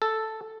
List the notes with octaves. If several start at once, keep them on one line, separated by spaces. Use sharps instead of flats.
A4